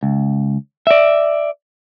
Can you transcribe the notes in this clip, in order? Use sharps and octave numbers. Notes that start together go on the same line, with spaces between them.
C#2
D5 E5